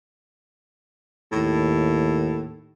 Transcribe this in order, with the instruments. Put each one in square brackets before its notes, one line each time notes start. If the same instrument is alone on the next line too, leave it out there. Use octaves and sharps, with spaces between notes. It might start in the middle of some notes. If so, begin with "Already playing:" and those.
[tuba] D#2 [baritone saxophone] A2